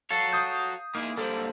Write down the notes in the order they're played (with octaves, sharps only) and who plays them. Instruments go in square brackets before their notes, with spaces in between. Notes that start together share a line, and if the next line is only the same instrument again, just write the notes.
[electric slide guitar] F#4 C#5 [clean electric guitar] A4 [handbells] F5 C7
[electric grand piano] D#6 G6
[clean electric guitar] A#3 [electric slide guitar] D#4 E4 G#4
[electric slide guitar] D3 A#3 [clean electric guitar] G3 [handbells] A4 C5